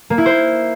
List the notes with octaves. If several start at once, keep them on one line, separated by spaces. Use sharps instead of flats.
A#3
E4
C5